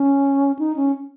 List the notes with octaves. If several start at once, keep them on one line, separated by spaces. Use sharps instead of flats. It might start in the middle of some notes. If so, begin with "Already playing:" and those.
Already playing: C#4
D#4
C#4